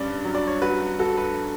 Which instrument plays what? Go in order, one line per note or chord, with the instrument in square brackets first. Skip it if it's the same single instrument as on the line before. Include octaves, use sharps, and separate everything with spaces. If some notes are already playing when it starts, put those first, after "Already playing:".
Already playing: [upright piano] G2 C#4 [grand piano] D5
[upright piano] F#3
[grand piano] D5
C#5
[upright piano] F#4 [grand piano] B4
[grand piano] B4
[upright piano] F#4 [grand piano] A4
[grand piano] B4